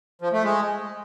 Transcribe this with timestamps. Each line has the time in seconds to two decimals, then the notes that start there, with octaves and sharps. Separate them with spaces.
0.21 F3
0.33 A3
0.44 G#3